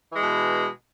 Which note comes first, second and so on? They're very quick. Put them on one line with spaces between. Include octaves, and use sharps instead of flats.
E3 G#3 B2